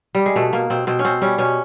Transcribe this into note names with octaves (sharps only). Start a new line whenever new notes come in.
G3
G#3
B2 A3
B2 A#3
B2 C4
B2 C4
C#4
B2 C4
G3 C#4
B2 C#4